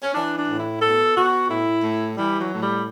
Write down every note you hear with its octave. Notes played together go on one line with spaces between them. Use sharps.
C#4
E3 D4
D4
A2
E4
B2 A4
B2 F#4
A2 E4
A2
E3 G3
F#3
A2
G3